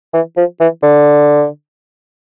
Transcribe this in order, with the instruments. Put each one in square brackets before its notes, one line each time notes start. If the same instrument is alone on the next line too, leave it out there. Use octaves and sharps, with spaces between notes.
[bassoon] E3
F3
E3
D3